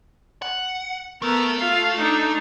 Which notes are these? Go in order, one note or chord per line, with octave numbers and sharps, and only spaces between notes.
F#5
A3 B3 A4 A#4
F4 F5
D4 D#4